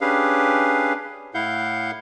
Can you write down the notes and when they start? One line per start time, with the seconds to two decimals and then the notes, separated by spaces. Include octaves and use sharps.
0.01 C#4 D4 G4 G#4 B4 F5
1.34 A2 E4 F5 F#5 G6